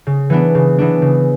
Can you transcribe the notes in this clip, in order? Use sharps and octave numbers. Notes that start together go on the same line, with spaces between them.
C#3
E3 B3 D4
C#3
E3 B3 D4
C#3